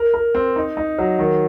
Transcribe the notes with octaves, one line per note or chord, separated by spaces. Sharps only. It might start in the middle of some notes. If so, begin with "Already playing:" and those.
Already playing: A#4
A#4
C4
D#4
D#4
F#3
D#3